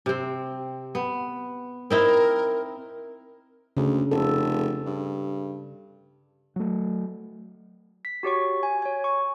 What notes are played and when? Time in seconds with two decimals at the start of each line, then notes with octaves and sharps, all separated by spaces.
0.06 C3 C4
0.95 B3
1.90 C4 D#4 E4 A#4
3.77 D2 C#3
4.11 F1 A4
4.86 G2
6.56 F#3 A3
8.05 B6
8.23 F#4 G4 C#5 C#6
8.63 G#5
8.82 C#5 G#5
9.04 C#6